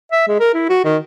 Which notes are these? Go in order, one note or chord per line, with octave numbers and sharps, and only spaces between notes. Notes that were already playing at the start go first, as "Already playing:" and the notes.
E5
G#3
A#4
E4
F#4
D#3